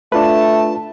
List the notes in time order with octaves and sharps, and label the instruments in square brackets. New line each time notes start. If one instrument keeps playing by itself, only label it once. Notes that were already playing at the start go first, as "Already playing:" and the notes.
[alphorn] A3 [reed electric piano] D4 F4 B4 [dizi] A5